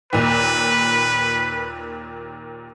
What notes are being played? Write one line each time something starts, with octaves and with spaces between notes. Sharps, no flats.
D#2 A#2 B4